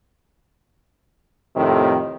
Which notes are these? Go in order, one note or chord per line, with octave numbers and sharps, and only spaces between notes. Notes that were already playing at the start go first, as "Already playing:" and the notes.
F2 A2 C3 D#3